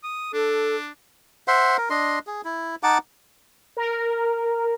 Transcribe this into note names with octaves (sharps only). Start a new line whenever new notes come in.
D#6
D4 A4
C5 E5 F#5 C6
A#4
D4 D#5 C6
G#4
E4
D#4 F#5 A5 D6
A#4